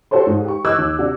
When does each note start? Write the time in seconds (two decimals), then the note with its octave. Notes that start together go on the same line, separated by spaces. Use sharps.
0.11 F#4 G4 A4 C5 C#5 C6
0.27 G#2
0.45 G4 C#6
0.65 D#5 C#6 D6 E6 F#6 G#6
0.78 D#2
0.99 C3 D4 F#4